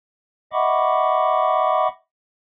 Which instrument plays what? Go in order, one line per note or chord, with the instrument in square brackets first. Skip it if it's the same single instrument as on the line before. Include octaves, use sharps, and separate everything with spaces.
[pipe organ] D#5 E5 F#5 B5 C#6 D6